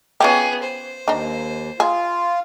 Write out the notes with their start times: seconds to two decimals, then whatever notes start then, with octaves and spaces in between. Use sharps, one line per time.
0.20 B3 C#4 F4 G4 G#4
0.62 C5
1.08 D#2 D4 D#4
1.80 F4 G#4